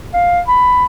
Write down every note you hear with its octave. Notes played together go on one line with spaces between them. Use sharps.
F5
B5